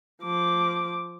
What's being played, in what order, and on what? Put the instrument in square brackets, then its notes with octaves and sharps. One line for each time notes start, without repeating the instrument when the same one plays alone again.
[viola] F3 D6